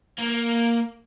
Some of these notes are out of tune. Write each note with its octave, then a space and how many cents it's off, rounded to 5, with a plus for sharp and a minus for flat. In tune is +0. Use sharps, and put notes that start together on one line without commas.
A#3 +0